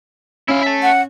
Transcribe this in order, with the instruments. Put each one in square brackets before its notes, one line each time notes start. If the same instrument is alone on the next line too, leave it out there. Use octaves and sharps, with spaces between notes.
[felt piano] C#4 [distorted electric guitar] E4 F5
[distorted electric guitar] E5 A5
[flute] F#5